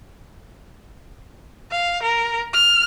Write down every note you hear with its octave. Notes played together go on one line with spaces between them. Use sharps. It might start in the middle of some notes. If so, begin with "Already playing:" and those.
F5
A#4
F6